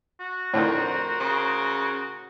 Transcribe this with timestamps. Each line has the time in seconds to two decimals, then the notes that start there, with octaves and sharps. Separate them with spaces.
0.20 F#4
0.53 F2 A2 D3 D#3 A#4 C5
1.20 C#3